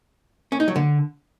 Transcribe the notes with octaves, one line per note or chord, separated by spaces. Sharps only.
C#4
D#4
F#3
D3